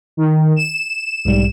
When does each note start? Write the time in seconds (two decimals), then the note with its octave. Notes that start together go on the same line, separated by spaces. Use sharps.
0.17 D#3
0.56 E7
1.25 B1 G#2 G3